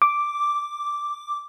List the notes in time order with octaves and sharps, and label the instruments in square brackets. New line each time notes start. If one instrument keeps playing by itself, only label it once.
[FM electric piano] D6